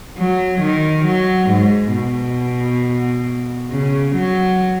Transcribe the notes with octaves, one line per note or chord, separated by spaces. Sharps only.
F#3
D#3
F#3
G#2
B2
C#3
F#3